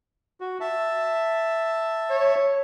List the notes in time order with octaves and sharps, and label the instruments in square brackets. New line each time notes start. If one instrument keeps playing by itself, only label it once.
[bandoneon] F#4
E5 A5
[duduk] C#5